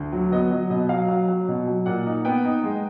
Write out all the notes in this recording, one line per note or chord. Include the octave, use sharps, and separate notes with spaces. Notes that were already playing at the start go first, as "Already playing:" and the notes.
Already playing: D2
F#3
B3 D#5
F#3 D#5
B2 D#5
F#3 F5
F#3
F#3
B2
F#3
A#2 F#5
D#4
B3 G5
D#4
G#3